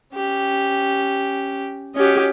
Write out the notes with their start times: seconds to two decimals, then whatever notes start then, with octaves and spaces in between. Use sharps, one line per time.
0.14 C#4 G4
1.95 C#4 F#4 G4 D#5